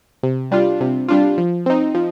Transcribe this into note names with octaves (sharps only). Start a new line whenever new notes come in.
C3
G3 D4 F4
C3
G3 D4 F4
F3
C4 D#4
F3